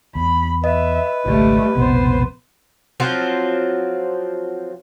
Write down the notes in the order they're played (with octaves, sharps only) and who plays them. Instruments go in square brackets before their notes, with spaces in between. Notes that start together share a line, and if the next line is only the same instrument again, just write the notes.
[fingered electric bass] E2 [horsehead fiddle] B5
[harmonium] B4 [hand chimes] D#5 [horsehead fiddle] E5
[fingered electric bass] G#1 C#2 [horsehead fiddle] G3 A3
[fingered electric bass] E1 A#1 C3 [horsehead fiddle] B3 C5
[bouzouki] F3 F#3 C4 F4